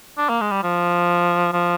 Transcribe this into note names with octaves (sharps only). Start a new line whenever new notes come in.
D4
A#3
G#3
G3
F3
F3